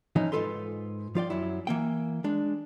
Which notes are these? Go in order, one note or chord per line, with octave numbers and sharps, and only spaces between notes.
E3 F3 C#4 D#4
G#2 F3 F4 A4 B4 C6
F3 F4 D5 G5
F#2 F#3 E4
E3 A#3 G5
G#3 D4